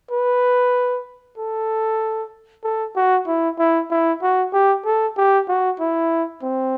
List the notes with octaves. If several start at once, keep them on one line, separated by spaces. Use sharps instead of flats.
B4
A4
A4
F#4
E4
E4
E4
F#4
G4
A4
G4
F#4
E4
C4